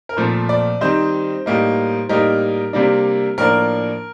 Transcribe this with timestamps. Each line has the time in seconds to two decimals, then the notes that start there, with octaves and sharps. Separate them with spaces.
0.09 A#4
0.17 A#2 F3 A3 C4 C5
0.49 D5
0.81 D#3 G3 C4 D#4 C5
1.46 A2 G3 A#3 D#4
2.09 A2 G3 A#3 D#4 A#4
2.73 C3 G3 A#3 D4
3.38 A2 F3 A#3 D4 A#4